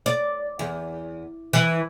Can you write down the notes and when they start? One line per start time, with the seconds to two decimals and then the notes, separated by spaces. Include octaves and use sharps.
0.06 D5
0.59 E2
1.53 E3